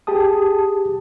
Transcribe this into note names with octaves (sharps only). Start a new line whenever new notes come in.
G4 G#4 A5 D#6